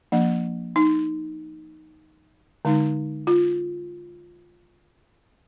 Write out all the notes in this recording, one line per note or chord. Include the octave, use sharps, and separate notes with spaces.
F3 A#3 D4
D#4
D3 G#3 D#4
F4